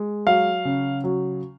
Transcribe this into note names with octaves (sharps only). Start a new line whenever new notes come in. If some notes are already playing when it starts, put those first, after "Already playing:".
Already playing: G#3
F#3 F5
C#3
F#3